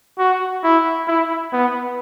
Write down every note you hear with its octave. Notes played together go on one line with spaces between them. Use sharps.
F#4
E4
E4
B3